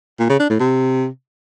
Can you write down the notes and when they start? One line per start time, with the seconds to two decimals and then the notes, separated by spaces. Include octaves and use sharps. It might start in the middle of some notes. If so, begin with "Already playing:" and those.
0.19 A#2
0.30 C#3
0.40 D4
0.50 A2
0.60 C3